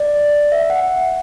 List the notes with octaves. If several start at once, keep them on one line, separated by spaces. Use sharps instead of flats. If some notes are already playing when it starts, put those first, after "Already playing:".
Already playing: D5
E5
F#5